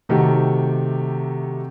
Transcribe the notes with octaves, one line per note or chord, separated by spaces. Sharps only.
C3 D#3 A3 F#4 G4